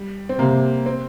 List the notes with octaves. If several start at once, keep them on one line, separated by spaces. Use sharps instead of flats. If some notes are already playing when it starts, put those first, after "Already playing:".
Already playing: G3
C4
C3 A#3
C4